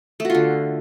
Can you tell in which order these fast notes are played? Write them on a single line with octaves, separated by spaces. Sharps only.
A3 F#4 F4 D3